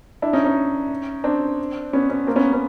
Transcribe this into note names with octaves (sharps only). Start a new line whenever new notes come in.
D4 E4
C#4 D#4
C#4 D#4
C4 D4
B3 C#4
B3 C#4
A#3 C4
B3 C#4
B3 C#4